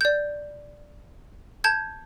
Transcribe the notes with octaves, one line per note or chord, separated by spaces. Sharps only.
D5 G6
A5 G6 G#6